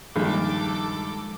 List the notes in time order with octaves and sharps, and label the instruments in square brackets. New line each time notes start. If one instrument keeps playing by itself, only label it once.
[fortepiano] A#1 [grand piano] G2 D#3 [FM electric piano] F3 G#3 [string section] A4 D6